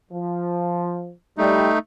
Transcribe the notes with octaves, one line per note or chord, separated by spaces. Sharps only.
F3
G3 A3 D#4